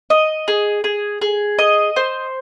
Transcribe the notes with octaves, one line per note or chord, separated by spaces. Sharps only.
D#5
G#4
G#4
G#4
D#5
C5